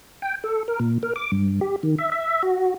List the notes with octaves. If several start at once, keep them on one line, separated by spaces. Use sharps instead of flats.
G5
A4
A#4
A#2
A#4
D6
G2
G4
D#3
E5
E5
F#4